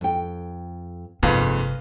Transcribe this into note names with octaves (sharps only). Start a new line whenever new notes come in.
F2 G5
G1 F2 G#2 C3 A#3 B4 F5